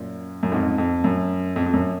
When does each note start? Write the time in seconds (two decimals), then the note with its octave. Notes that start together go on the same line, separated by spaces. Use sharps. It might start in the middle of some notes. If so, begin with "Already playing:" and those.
Already playing: F#2 A#2
0.43 F#2
0.52 F2 G#2
0.78 F2
1.04 F#2
1.56 F2
1.66 F2
1.73 F#2